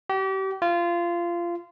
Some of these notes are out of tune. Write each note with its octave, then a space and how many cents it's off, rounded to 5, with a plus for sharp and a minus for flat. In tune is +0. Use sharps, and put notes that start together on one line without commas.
G4 -35
F4 -20